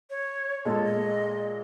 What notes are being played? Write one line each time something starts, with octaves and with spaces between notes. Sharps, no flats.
C#5
A#2 G#3 A4
D#5